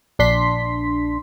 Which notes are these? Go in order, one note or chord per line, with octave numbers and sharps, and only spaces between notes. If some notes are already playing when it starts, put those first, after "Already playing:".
A#1 D4 C6 B6